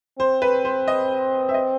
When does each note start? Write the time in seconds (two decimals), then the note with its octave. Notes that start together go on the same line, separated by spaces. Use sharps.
0.19 C4 C5
0.42 B4
0.65 C5
0.88 D#5
1.49 E5
1.54 D#5